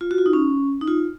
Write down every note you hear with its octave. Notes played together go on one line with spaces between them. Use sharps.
F4
F#4
F4
D#4
C#4
D#4
F4